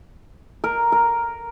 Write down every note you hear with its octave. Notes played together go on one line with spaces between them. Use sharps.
A#4
A#4